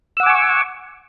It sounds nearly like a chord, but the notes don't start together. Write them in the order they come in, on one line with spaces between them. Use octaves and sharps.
E6 F#5 D6 G#5 C#6